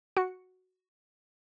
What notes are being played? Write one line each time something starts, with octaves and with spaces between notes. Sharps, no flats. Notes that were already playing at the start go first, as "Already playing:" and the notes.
F#4 C#7